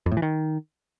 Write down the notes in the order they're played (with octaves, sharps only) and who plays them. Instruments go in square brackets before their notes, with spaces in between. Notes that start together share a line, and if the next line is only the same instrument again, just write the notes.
[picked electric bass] F2
A2
E3
D#3